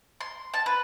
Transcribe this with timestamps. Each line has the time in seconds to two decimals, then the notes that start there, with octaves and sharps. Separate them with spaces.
0.21 C6
0.54 A5
0.66 B4